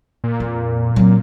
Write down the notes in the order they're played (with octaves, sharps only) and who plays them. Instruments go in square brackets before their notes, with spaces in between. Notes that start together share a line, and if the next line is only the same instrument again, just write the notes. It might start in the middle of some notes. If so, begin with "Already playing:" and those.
[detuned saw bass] A#2
[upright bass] F2
F#3 C4